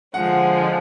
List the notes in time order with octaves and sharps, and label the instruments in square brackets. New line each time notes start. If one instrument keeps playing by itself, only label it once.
[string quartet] D3 F3 G#3 [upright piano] F#5